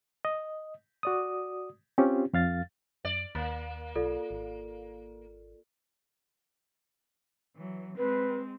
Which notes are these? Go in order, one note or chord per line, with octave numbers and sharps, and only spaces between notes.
D#5
F#4 D5 D#6
C4 C#4 F4 G4
F2 F5 A6
F#2 D5
D#2 A#3
B1 F4 A4 D5
G#1
E3 F#3
G#3 C4 B4